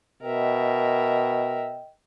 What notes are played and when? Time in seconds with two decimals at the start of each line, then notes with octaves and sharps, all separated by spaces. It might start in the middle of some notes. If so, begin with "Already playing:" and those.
0.22 B2 A#4 D#5 E5 G5